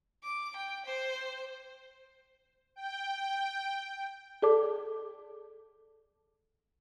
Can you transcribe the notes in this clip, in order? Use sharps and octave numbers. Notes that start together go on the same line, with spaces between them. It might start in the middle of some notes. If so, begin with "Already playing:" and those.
D6
G5
C5
G5
G#4 A4 D5 A5 D6